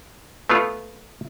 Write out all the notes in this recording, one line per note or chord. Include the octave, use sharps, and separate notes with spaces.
A3 B3 F4